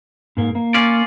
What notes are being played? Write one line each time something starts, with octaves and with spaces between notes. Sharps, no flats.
G#2 A#3
A#3
C#4 F4 D5